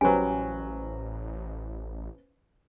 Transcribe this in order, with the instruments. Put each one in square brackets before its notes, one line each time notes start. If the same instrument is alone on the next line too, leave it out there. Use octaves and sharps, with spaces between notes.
[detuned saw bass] A1 [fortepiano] F#3 G3 [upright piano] C#4 B4 C5 [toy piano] G#5